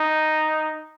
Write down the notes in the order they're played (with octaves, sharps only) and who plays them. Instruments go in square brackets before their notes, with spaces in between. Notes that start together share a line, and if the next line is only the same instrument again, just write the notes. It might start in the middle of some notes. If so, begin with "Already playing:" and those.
Already playing: [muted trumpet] D#4